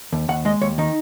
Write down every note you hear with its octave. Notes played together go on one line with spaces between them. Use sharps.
D#2
D#2 F#5
G#3 D#5
D#2 C#5
D#3 D#4